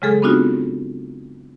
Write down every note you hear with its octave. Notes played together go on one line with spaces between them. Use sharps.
C#3 F#3 G#3 G#4 A4 F6
B3 C4 D4 D#4 F4 F#4